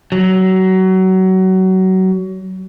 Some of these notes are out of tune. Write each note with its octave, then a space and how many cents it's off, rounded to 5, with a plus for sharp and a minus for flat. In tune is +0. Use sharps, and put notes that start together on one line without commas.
F#3 +25